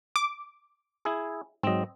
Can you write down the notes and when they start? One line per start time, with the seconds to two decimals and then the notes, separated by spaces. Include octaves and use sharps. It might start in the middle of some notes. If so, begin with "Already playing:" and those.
0.16 D6
1.05 E4 G#4
1.63 G#2 F#3 C4 D#5